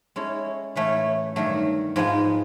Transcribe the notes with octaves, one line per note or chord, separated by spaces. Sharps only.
G#3 C#4 E4 A4
A2 E3 A3 C#4
G2 D#3 F#3 A3
G#2 F3 G#3 B3 D#4